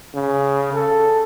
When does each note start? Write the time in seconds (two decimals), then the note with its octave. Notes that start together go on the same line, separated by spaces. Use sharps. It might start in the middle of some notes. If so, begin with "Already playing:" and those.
0.15 C#3
0.74 A4